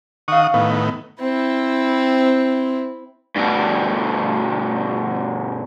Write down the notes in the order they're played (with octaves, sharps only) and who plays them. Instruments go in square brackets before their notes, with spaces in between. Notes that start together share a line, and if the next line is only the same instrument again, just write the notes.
[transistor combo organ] D#3 F#5 D#6 [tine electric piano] F5 C#6
[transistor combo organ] A2 D#3 B3
[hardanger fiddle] C4 E4
[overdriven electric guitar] G2 B2